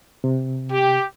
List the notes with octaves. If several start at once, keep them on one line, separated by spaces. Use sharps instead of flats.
C3
G4